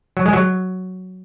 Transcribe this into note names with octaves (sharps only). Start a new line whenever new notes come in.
F#3
G#3
F#3